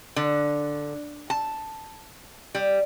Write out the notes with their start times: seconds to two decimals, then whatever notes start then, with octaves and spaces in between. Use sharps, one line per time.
0.16 D3
1.30 A5
2.55 G3